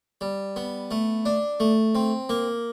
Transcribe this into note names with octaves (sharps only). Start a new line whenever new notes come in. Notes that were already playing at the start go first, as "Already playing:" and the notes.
G3
B3
A3
D4
A3
C4
A#3